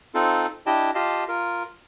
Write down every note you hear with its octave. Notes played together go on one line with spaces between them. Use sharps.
C4 D#4 F4 A4
D4 E4 G4 D#5 G5 A5
F4 G4 D#5 F5 A5
F4 A#4